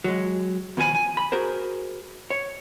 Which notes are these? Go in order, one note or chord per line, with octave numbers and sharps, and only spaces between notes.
F#3 G#3
D#2 B2 F3 G#4 G#5 B5
G#5
B5
F#4 G#4 A#4 C5
C#5